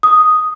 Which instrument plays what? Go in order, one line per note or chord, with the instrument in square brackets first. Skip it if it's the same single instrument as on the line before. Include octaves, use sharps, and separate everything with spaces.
[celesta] D#6